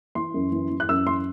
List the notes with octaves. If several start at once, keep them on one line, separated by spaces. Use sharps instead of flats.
E3 C6
F#2
E3
E3
F#6
F#2 E6
E3 C6